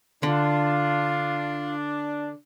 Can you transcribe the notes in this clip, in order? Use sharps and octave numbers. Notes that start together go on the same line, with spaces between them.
D3 D4 F4